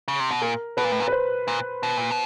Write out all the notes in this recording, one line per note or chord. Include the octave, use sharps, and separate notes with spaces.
C#3
C3
B2
A#2 A#4
B2 B4
A#2
A2
A#2
B4
C5
A#2
B2
A#2
B2